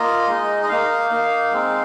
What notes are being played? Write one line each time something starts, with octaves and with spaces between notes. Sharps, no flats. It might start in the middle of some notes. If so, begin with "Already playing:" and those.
Already playing: A#3 F4 D#5
G#3 D#4
D#5
A#3 D#4 F5
A#3 D#4
G#3 C4 D#4